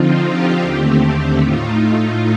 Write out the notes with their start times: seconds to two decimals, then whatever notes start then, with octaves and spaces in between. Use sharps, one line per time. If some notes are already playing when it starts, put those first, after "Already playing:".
Already playing: D3 F3 C4 D#4 F4
0.25 G4
0.63 D#2 D3 A3 C4 G4
1.02 G4
1.40 A2 A3 D#4 F4